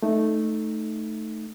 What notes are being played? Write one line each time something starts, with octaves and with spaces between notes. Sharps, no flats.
A3 D#4